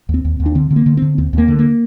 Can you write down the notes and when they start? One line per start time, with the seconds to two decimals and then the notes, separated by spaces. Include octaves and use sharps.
0.09 D#2
0.14 C4
0.25 D#2
0.40 D#2
0.46 D4
0.55 D3 C4
0.70 D3
0.76 A#3
0.86 D3
0.97 D3 C4
1.18 D#2 C4
1.33 D#2 A#3
1.48 D3
1.59 A#3